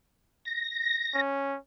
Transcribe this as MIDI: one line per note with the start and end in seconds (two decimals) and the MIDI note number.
0.45 1.21 94
1.15 1.58 61